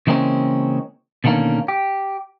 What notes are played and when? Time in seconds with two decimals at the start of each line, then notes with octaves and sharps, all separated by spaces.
0.07 C#3 E3 G#3 A#3 C4 C#4
1.24 B2 D3 D#3 G3 A#3 C#4
1.68 G4